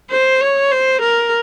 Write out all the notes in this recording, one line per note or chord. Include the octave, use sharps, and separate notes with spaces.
C5
C#5
C5
A#4